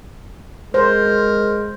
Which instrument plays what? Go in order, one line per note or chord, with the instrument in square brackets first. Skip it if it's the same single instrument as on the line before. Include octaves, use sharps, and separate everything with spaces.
[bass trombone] G#3 [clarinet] A#4 [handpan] C5